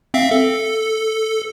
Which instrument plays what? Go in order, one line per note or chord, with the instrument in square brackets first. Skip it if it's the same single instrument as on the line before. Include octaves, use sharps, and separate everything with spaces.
[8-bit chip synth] C4 E5 F5
A4